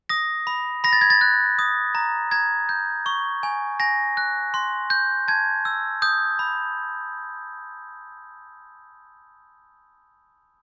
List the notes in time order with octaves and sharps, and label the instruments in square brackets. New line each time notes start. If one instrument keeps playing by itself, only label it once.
[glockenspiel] D#6 A#6
B5
B5 A#6
A6
G#6
A6
F#6
D#6
A#5
A#5 G#6
G6
C#6
G#5
G#5 A#6
F#6
C6
G6
A5 G#6
E6
D#6 G6
B5